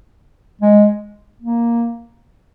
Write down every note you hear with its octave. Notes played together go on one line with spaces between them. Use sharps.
G#3
A#3